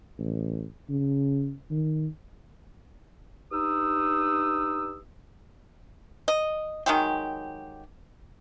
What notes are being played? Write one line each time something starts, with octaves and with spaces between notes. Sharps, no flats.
A1
C#3
D#3
G2 D#4 D#6 E6
D#5
D#3 F#3 G#3 G4